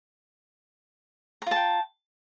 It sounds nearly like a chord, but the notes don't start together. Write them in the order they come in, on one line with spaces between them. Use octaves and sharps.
A#5 F4 A5 G5